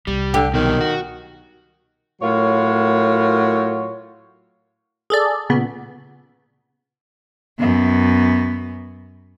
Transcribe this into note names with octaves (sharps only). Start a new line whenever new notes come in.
C2 G3
D3 G4
B2 D#3 F#3 G3
F#4
A2 F#3 F4 A#4 C#5
G#4 A4 D5
A#2 C#3 B3
F#2 B3